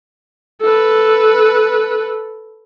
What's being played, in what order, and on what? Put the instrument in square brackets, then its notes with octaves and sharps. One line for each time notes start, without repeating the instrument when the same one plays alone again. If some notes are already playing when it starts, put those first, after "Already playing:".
[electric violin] A4 B4